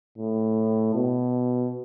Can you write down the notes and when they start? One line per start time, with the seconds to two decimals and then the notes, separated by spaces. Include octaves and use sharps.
0.18 A2
0.94 B2